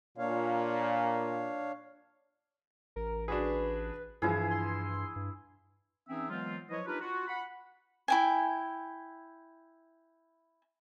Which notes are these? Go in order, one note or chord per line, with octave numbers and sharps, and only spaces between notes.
A#2 D4 C#5 F5
A1 A#4
D4 F#4 G#4 B4
G2 E3 F3 E4 G#4
C6
G2
E3 C4 C#4 D#4 G#4 E5
E3 F#3 G#3 B3 C4 F4
F3 F#3 E4 B4 C#5 D#5
D4 D#4 F4 G4 A#4 B4
F4 F#4
F#5 B5
E4 G5 G#5